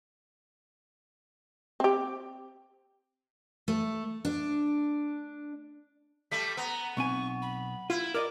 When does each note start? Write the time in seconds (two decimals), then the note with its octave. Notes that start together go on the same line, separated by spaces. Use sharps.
1.80 C4 G4
3.68 A3
4.25 D4
6.31 G3 A3 B6
6.57 B3 A#5
6.97 B1 C4 G#5 C#6
7.42 B5
7.90 E4 F4
8.14 A#4 D5 D#5 D6